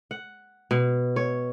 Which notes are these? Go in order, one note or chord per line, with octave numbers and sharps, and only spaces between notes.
F#5
B2
C#5